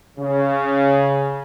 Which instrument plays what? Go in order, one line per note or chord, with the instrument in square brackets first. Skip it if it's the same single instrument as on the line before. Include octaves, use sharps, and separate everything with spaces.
[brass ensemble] C#3